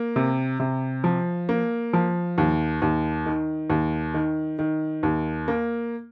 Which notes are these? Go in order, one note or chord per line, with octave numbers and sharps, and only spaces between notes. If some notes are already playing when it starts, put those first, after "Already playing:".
Already playing: A#3
C3
C3
F3
A#3
F3
D#2
D#2
D#3
D#2
D#3
D#3
D#2
A#3